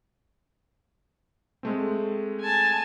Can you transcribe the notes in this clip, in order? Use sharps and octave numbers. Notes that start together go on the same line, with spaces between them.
G#3 A3 C4
G#5 A5